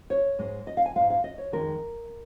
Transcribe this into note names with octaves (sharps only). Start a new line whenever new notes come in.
C#5
G#2 G#3
D#5
F5
G#5
G#2 G#3 F5
F5
D#5
C#5
F2 D#3 G#3 A#4